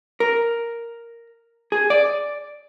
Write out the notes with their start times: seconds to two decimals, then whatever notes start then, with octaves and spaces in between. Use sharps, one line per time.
0.20 A#4
1.72 G#4
1.90 D5